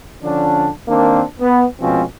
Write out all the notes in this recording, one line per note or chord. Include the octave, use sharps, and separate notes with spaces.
D3 F3 C#4 D4
D#3 A#3 C4 D4
B3
B2 F3 G#3 C4 C#4